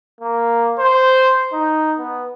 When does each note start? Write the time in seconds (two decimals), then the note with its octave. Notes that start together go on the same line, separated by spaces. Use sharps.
0.21 A#3
0.79 C5
1.53 D#4
1.98 B3